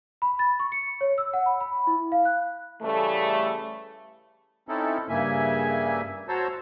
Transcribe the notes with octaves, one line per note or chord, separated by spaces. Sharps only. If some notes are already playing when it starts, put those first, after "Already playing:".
B5
A6
C#6
C#7
C#5
E6
F#5
B5
B5
E4
F5
F#6
C#3 E3 G3 A3
C4 C#4 D#4 E4 A4
G2 C#3 A#3 E5 G#5
F#4 C5 C#5 A5 A#5 E6